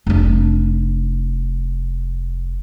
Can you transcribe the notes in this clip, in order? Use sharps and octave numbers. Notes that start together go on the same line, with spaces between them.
F1 D4